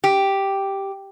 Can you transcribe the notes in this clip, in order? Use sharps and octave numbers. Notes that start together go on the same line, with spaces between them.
G4